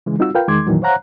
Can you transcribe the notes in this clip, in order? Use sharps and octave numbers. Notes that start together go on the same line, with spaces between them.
C#3 E3 G#3
G3 C4 D#4 F4 F#4 E6
F4 A#4 B4 F5 G5
E2 D#3 G#3 C6 D6 G#6
F2 A#2 D#3 E3 F#3
C5 C#5 F5 F#5 A#5 F#6